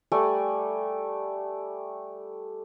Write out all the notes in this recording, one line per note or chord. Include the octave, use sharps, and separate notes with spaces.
G3 A3 D5 G#5